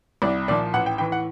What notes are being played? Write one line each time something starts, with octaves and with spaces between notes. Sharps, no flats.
C2 D5
A#2 F3 D5
A1 F#5
G5
A2 E3 G5
F#5